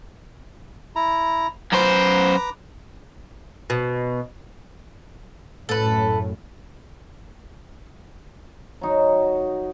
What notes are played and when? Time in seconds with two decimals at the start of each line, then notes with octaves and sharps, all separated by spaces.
0.96 E4 A#5
1.73 F#2 B4 C5 A#5 D6
3.70 B2
5.69 F#2 A2 A4 B4
8.81 F#3 D#4 F#4